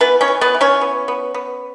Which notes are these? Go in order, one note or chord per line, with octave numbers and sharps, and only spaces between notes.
E3 B3 B4
C#4 C#5
E3
B3 B4
E3
C#4 C#5
B3
B3
B3